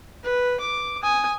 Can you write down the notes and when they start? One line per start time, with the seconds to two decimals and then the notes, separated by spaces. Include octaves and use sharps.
0.23 B4
0.60 D6
1.03 G#5 D#6